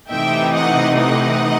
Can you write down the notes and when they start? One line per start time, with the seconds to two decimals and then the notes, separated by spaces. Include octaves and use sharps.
0.10 C3 E3 A3 D#4 E5 G5
0.55 D#5 F#5
1.01 D#5 F#5